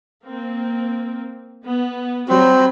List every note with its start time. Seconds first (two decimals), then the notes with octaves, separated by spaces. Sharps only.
0.23 A#3 C4
1.65 B3
2.29 F#3 G3 C4 B5